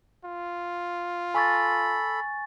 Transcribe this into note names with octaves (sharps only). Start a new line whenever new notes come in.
F4
A4 G#5 B5 C#6 A6